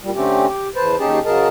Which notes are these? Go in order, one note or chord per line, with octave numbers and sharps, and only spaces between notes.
A#2 G3
D3 A3 C4 C#4 G4
G4
E2 B4 C5 A5
D#2 C#4 D#4 G4 G#4 A5
C#3 F#3 G#4 A#4 D#5 A5